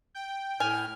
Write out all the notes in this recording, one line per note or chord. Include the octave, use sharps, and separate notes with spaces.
G5
A2 G#5 F6